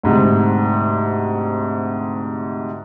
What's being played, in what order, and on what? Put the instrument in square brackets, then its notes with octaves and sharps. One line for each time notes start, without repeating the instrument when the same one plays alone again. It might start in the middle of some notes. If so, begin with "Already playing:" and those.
[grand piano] D2 G#2 C3